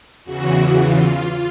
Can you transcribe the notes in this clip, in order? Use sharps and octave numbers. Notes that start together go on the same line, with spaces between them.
E2 C#3 E3 F#4
F4